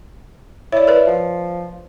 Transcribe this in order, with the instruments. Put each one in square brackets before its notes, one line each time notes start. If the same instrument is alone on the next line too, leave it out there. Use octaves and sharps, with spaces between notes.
[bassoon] E4 [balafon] C#5 D5
[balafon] A#4 B4 D5
[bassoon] F3